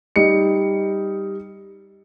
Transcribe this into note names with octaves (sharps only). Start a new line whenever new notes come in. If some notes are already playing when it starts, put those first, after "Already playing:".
G3 D#4 C#7